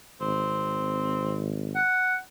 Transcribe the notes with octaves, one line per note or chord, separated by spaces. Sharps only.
G#1 C4
F#5